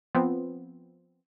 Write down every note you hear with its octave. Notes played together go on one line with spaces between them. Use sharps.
F3 B3 C4